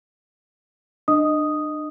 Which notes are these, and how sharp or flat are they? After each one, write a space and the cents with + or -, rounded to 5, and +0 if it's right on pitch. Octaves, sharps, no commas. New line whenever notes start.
D4 +35 D#5 +0 D#6 +0